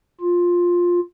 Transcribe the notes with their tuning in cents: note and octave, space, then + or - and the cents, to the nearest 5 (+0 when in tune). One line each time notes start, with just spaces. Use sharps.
F4 +10